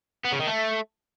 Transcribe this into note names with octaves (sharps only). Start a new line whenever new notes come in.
B3
C#3
D#3
A3